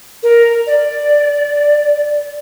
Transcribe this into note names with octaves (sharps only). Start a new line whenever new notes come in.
A#4
D5